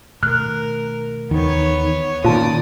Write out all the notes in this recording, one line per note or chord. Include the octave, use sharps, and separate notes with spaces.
B2 D#3 A3 A#4 F6 F#6
D#2 D#3 E3 B3 C#5
A#2 D#3 C#4 F4 D5 A5 D#6